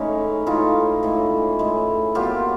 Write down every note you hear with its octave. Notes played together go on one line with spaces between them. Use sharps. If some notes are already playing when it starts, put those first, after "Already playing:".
Already playing: A2 E3 G#3 C#4 D#4
A2 E3 G#3 D#4 F4
A2 E3 G#3
A2 E3 G#3
A#2 F#3 B3 F4 G4